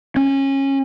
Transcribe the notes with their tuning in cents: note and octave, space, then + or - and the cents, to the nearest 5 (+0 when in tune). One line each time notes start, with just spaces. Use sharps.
C#4 -20